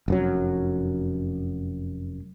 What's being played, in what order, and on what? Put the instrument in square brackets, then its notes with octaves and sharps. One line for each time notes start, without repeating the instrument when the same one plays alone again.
[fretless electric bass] F1 F#2 F#3